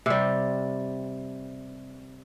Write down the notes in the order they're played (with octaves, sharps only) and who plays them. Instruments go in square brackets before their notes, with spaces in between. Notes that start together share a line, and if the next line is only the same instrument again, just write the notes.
[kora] C3 G3